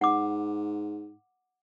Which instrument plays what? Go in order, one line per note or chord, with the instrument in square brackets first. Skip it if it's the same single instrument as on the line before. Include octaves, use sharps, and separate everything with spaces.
[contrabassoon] G#2 [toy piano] F#5 D6